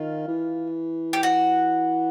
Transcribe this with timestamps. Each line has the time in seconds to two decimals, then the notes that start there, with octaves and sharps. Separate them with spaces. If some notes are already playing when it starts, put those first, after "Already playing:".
Already playing: D#3 F4
0.28 E3
1.13 G4
1.23 F#4